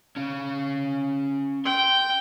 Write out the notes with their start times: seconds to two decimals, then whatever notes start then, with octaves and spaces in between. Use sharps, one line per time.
0.16 C#4 F5
1.66 G5 C6